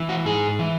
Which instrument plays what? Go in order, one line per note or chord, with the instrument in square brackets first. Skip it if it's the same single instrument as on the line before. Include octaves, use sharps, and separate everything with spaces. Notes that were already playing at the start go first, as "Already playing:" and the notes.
Already playing: [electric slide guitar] E3
F#4
G#2 G#4
E3